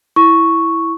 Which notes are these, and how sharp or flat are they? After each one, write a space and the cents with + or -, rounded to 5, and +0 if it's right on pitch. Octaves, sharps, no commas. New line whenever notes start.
E4 +0 C#6 +0